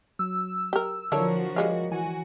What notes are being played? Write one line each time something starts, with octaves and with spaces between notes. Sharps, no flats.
F#3 E6
G4 A#4
D3 F3 D4 E4 F#4 A4 A#4 C#5
G3 G#3 F4
E3 F#4 G#5